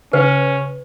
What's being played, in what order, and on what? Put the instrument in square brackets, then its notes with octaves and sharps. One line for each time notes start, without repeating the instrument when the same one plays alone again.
[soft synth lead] C#3 [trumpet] C#4 [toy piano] B4